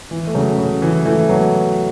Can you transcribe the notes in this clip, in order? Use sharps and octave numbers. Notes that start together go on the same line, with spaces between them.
E3
A3
C#3 F#3
C#3
E3
E3 A3
F#3 B3